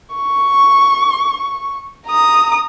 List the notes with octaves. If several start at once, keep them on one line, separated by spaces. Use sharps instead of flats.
C#6
A#5 D#6